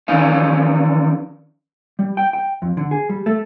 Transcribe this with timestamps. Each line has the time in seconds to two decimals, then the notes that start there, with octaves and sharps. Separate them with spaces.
0.08 D#3 E3 C#4 D5 F5
1.99 G3
2.17 G5
2.33 G5
2.62 F2
2.77 D3
2.91 G#4
3.09 G3
3.26 A3